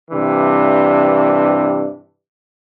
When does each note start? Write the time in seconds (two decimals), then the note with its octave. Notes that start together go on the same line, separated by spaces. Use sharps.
0.11 G2 C3 E3 D4